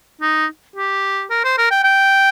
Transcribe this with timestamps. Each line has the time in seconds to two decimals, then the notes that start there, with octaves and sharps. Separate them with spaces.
0.21 D#4
0.76 G4
1.30 A#4
1.44 C5
1.58 A#4
1.71 G5
1.84 G5